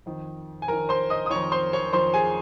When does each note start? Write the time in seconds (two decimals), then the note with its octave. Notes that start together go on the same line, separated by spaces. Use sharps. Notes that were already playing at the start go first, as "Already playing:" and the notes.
0.06 F2 D#3
0.62 G#5
0.68 F2 D#3 A#4 A#5
0.89 C5 C6
1.10 D#5 D#6
1.26 D#6
1.30 F2 D#3 C#5 C#6
1.52 C5 C6
1.73 C#5 C#6
1.93 F2 D#3 C5 C6
2.14 G#4 G#5